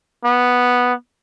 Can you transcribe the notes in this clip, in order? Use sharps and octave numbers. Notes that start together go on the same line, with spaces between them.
B3